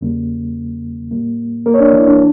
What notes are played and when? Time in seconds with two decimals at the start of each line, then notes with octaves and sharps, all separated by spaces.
0.01 E2 C#3 G3 A#3
1.11 A2 G3 A#3
1.66 A#3 A#4
1.74 C#5
1.80 D4 D5
1.93 E3 E4
2.08 D4